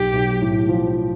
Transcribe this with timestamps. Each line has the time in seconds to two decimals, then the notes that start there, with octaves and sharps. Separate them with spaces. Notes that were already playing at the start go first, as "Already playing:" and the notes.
Already playing: B1 G4
0.13 B1
0.41 A2
0.69 F3